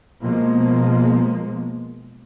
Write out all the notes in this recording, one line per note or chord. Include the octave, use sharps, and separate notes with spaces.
B2 F3 G#3 A#3